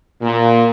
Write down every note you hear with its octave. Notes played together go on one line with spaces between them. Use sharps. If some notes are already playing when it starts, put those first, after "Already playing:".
A#2